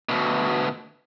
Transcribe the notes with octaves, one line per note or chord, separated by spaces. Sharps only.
D2 B2